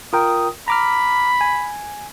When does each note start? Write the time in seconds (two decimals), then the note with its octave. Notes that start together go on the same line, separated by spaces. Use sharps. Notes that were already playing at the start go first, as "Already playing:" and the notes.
0.13 F4 A#4 G5 D#6
0.68 A#5 B5 D6 F6
1.41 G#5